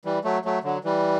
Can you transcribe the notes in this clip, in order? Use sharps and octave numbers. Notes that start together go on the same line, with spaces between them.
E3 G3
F#3 A3
F#3 A3
D3 F#3
E3 G3